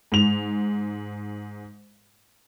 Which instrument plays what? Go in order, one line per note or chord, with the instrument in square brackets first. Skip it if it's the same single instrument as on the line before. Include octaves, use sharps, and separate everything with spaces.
[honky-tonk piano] G#2 F7